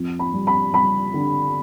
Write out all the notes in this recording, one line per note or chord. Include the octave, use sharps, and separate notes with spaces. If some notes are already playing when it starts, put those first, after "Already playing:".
Already playing: F2
B5
G3
B5
G3 B5
D3